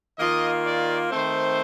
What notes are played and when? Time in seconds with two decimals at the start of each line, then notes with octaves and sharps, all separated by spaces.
0.18 D#3 A#3 F4 D#5
0.64 D5
1.10 D#3 A3 C4 C5